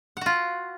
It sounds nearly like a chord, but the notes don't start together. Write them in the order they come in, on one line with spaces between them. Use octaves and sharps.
F#5 F#4 F4